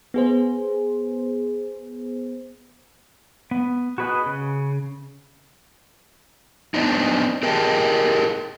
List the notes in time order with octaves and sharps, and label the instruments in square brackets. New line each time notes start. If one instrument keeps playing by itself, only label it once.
[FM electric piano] B3 G#4 C5
[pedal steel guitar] B3
F#4 G#4 B4 D#5 F#6
C#3
[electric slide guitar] B3 C4 D4 D#4
G4 G#4 A#4 D#5 G5 A5